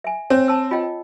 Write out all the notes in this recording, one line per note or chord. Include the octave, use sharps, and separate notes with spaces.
E5 G#5
C4 C#5
A5 E6
F4 D#5 G5